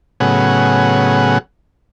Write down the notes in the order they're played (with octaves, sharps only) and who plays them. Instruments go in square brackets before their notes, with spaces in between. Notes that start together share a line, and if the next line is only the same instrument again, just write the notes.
[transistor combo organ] A2 C#3 F#3 B3 G#4 F#5